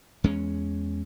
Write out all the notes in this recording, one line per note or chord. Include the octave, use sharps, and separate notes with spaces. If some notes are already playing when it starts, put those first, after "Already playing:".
E2 G#3 C#4